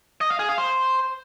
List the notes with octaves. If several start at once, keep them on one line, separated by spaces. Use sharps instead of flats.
D#5
F5
G#4
F5
C5